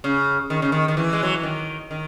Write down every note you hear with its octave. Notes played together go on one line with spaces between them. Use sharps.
C#3
D#3
C#3
D#3
D#3
E3
G#3
F#3
E3
D#3
D#3